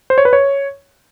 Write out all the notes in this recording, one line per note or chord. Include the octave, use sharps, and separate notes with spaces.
C5
C#5
B4
C#5